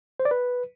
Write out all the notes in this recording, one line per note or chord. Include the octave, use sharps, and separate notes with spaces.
C5
D5
B4